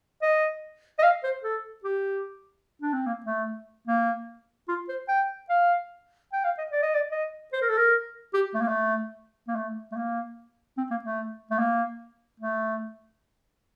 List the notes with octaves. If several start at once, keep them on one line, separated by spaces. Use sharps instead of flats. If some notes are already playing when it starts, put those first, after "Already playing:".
D#5
D#5
F5
C5
A4
G4
D4
C4
A#3
A3
A#3
F4
C5
G5
F5
G5
F5
D#5
D5
D#5
D5
D#5
C5
A#4
A4
A#4
G4
A3
A#3
A3
A#3
A3
A3
A#3
C4
A#3
A3
A3
A#3
A3